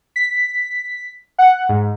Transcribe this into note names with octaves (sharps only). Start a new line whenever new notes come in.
B6
F#5
G#2